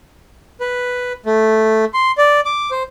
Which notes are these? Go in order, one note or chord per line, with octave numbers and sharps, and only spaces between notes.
B4
A3
C6
D5
D6
C5